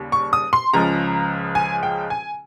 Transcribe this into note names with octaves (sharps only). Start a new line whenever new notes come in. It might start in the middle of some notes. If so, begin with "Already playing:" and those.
Already playing: D#2 C#3 G3
C#6
D#6
C6
C#2 C#3 F3 G#3 A#5
G#5
G5
G#5